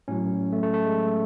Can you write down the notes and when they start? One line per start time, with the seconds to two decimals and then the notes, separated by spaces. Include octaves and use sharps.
0.08 A2 F#3 C#4
0.52 A3
0.63 A3
0.74 A3
0.85 G#3